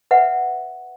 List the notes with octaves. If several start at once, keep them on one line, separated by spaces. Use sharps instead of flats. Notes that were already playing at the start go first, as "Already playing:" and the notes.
B4 E5 F#5